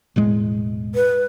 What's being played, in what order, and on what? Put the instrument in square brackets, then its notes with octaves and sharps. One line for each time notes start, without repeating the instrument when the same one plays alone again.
[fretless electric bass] E1 A2 G#3
[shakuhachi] B4